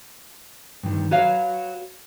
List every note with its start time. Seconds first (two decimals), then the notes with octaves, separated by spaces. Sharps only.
0.83 G2 D#3
1.11 F#4 B4 C#5 F5